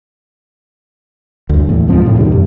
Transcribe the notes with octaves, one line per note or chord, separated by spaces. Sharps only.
D2 G2
E2 A2
D2 G#2 F3 C4
D2 A2 C#3
E2 B2 D#3 G3
F#2